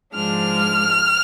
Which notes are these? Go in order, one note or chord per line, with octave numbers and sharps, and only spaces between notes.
G#2 F3 G#3 D4 F6